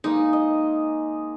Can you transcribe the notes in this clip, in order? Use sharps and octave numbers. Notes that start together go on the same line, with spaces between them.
G#3 A#3 D#4
D#5